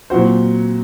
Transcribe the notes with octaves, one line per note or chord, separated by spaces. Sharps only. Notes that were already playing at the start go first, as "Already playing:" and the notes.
A#2 F#3 C4 F#4 C5